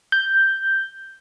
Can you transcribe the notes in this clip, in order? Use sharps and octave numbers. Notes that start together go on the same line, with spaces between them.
G6